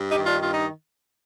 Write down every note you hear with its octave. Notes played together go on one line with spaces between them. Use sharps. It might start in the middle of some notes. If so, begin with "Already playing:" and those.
Already playing: G2
D#4 G4
D#3
D4 F4
G2 F4
D#4